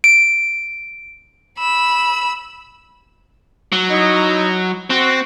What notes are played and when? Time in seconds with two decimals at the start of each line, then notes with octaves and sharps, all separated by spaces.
0.04 D7
1.58 B5 E6
3.72 F#3
3.90 D#4 E4 D#5
4.90 C4 F#4